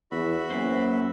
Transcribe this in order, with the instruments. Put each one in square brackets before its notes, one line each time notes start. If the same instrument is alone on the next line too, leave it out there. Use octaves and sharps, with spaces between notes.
[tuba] E2 [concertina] F#4 E5 B5
[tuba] F#2 [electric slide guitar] A#3 C5